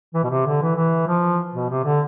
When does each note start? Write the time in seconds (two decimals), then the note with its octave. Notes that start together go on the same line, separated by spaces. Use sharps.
0.15 E3
0.24 B2
0.30 C3
0.46 D3
0.62 E3
0.77 E3
1.07 F3
1.54 B2
1.70 C3
1.84 D3